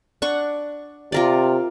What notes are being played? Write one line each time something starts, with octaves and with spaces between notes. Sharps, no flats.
D4 F#5 C#6
C3 F4 A#4 D5